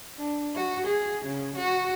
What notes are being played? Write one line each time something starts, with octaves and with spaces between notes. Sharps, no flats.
D4
F#4
G#4
C#3
F#4